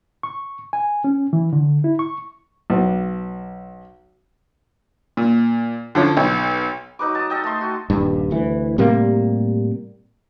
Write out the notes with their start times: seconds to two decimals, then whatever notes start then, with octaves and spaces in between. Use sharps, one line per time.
0.23 C#6
0.73 G#5
1.04 C#4
1.33 E3
1.53 D3
1.84 E4
1.99 C#6
2.70 B1
5.17 A#2
5.95 D3 F3 C#4 D4
6.17 B1
6.99 F#3 D#4 B4 D6
7.15 A5 D#6
7.30 A4 D#5 G5
7.44 A3 C6
7.61 F#4
7.90 D#1 G2
8.31 D2 E3
8.78 A2 C3 G3 A#3